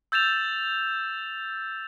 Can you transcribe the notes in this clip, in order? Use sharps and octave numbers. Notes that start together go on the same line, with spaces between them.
E6 G6 A6 E7 F7